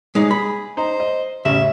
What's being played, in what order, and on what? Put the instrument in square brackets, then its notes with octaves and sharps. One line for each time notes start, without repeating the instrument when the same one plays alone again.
[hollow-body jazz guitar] G#3 D#4 D5 [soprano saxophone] G#4
[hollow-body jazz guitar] B5
[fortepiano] D#4 [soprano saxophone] C5
[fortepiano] D#5
[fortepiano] A1 C#4 [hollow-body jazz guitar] C#3 [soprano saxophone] E5